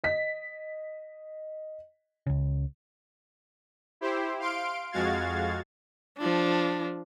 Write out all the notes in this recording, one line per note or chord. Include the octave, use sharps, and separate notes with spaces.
D#5 B6
C#2 C#3
E4 G4 C5
F5 C6 D7
F2 G#3 F#4 F5 G#6 A6
F3 D4